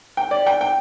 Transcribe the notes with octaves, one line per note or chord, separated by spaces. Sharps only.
G5
D5
G5
G5